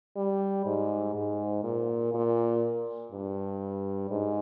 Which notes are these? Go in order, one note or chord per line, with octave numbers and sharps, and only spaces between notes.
G3
G#2
G#2
A#2
A#2
G2
G#2